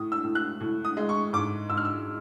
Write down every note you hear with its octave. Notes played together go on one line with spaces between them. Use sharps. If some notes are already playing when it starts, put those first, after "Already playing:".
Already playing: A2 D#6
E6
A2
F#6
A2
D#6
G#3
C#6
G#2 D6
G#2 E6
F6
E6